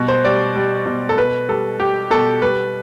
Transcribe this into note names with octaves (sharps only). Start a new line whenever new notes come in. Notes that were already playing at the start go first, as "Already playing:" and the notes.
Already playing: B2 G3
C5
G3 D5
G3
B2
A4
B2 B4
G3 A4
G3 G4
B2 A4
G3 B4